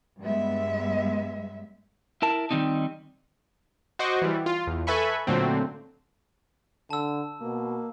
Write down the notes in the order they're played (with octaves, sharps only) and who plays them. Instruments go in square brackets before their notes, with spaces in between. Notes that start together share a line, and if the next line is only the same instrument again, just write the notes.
[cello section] G2 G3 G#3 B3 E5
[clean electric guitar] E4 A#4 A5
D#3 G3 C4 D#4
[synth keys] F#4 C5 D#5 C#6 D6
E3 G3
F4
E2
A4 B4 E5 G#5 B5 C#6
A#2 D3 F#3 A3 C4
[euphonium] D3 [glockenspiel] A5 E6
[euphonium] B2 [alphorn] A#3